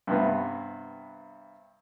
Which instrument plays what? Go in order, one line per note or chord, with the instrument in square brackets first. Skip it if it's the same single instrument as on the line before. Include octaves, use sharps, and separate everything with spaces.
[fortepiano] G2 C3 B3